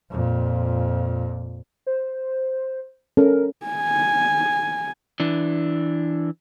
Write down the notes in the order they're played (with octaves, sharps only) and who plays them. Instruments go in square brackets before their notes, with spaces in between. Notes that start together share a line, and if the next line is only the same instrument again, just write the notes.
[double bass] F2 A#2
[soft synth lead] C5
[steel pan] C#4 A4 [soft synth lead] A#4
[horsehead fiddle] G#5
[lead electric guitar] E3 D4